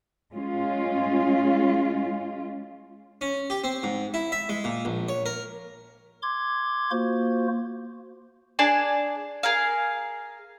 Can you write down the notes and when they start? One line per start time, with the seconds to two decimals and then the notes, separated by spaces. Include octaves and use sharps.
0.33 G#3 C#4 F4
3.21 C#4
3.50 G4
3.64 C4
3.83 G#2
4.14 E4
4.32 E5
4.49 G#3
4.64 A#2
4.85 A#1
5.08 C#5
5.26 A#4
6.22 C6 D6 G#6
6.91 A#3 F4 F#4 C5
8.59 D4 G#4 D5 A5
9.43 G#4 A#4 F5